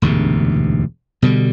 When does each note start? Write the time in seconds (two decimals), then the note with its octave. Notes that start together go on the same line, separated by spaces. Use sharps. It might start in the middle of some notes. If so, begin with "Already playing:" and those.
0.02 E1 D2 G#2 C3
1.22 B2 D3 F3 G3